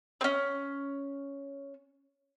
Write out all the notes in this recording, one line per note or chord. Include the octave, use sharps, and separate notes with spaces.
C4 C#4